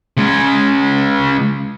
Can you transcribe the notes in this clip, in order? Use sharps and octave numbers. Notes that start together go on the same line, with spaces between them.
C#3 G#3